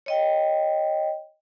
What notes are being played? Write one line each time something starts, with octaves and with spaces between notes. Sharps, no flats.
C#5 D#5 G5